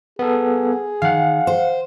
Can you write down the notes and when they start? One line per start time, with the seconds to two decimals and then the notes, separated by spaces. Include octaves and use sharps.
0.19 B3 G#4 A4
1.02 D#3 F5 F#5
1.47 C5